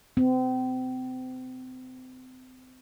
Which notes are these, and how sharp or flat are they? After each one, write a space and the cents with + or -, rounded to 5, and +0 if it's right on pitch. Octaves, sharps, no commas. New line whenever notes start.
C4 -35